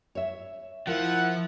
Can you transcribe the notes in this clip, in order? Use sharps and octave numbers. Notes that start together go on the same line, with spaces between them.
C#5 E5
F3 E4 A#4 F5 F#5